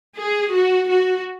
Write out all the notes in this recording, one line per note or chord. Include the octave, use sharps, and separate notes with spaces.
G#4
F#4
F#4